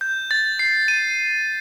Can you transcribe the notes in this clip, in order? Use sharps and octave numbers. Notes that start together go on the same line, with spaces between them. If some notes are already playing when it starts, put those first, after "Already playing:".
G6
A6
C7
D#7